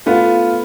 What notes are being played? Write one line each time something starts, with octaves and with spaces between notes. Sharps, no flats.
A3 B3 F4